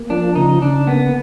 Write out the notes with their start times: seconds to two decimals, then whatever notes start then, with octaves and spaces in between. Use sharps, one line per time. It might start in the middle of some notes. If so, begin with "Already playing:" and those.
Already playing: A#3
0.10 F3 D4
0.35 C#3 D#4
0.61 C#3 D4
0.87 A#3 B3